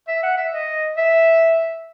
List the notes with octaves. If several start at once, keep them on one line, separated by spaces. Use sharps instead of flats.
E5
F#5
E5
D#5
E5